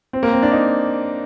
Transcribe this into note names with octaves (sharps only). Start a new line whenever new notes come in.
C4
A#3
C4
D4
D#4